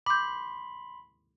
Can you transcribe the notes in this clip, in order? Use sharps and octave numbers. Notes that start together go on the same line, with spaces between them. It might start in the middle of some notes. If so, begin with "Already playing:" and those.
B5 C6 D6 G6